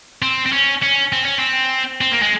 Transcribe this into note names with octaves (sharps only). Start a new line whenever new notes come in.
C4
C4
C#4
C#4
C4
C#4
C4
C4
A#3
G#3